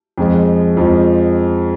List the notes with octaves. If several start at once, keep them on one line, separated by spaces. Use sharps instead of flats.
F2 F3 G#3
F2 F3 G#3